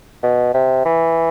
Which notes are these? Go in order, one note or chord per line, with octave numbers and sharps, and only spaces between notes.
B2
C3
E3